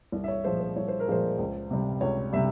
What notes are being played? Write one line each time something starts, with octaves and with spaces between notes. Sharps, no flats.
C2
E5
C#5
A#2 F3 G#3 C5
C5
C2 C#5
C5
A#4
A#2 F3 G#3 C5
C#2
C3 G3
C#2 C#5
C3 G3 E5